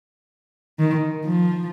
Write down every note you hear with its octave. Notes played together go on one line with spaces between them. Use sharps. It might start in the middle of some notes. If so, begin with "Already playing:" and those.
D#3
F3